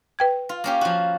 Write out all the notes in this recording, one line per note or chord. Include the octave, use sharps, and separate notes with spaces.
B4 G5 G#6
F4
A#3 C#4 G4
F3 F#4